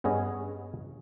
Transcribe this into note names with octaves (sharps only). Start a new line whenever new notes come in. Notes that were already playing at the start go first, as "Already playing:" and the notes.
G2 B3 C#4 G#4 D#5